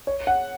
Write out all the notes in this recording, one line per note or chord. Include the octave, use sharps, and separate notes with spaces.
C#5
F#5